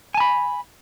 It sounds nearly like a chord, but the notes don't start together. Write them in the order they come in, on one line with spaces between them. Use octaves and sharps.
G#5 A5 B5